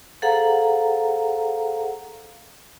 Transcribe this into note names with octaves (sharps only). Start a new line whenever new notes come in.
G#4 A4 C5 F5 F#5 A#5